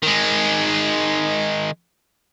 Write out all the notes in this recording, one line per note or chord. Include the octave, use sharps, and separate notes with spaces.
D#3 G#3